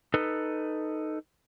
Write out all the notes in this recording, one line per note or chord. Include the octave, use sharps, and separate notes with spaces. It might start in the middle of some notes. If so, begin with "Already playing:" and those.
D#4 A4 B4